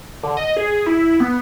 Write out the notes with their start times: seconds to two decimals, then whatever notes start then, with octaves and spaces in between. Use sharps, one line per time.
0.23 D3
0.37 D#5
0.57 G#4
0.86 E4
1.20 B3